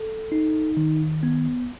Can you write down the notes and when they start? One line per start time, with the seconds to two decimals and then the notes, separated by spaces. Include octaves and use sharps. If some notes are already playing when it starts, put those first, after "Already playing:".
Already playing: A4
0.32 D#4
0.77 D#3
1.23 B3